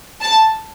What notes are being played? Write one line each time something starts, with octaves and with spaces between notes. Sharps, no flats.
A5